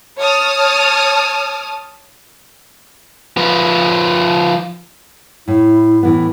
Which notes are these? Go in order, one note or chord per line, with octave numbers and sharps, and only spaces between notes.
C#5 A5 D#6 F6
F3 B4
A2 E4
A2 E3 B3